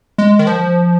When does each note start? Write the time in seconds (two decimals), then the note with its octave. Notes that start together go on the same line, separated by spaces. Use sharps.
0.18 G#3
0.39 D#3
0.47 F3